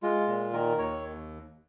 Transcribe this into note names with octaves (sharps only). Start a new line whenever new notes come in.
G#3 F4
A#2
D#3 A#4
D#2 C#5